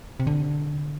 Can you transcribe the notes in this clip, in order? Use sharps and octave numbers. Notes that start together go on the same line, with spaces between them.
C3
D3